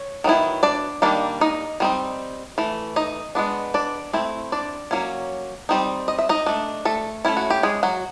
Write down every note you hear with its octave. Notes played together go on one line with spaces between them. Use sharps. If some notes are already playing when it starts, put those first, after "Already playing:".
Already playing: C#5
D#3 F#3 B3 E4
D4 D5
D#3 G3 A#3 D4
D#4 D#5
G3 C4 D#4
E3 A3
D#4 D#5
G#3 B3 D4
D4 D5
A3 C4 E4
D4 D5
F#3 A#3 C#4
G3 C4 D#4
D#5
E5
D#4 D#5
A3 D4
A3 A4
A3 C#4 E4
F#4
G4
G#3 G#4
F#3 F#4